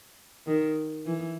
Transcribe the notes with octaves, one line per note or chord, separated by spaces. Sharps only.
D#3
E3